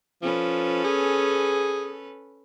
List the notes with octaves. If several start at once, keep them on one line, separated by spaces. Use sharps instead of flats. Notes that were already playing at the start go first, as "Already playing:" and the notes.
F3 C#4 A4 B4
G#4